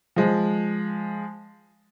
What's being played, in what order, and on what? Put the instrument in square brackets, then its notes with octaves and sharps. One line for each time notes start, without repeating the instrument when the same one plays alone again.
[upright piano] F3 G#3